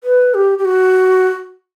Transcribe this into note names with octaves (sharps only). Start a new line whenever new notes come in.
B4
G4
G4
F#4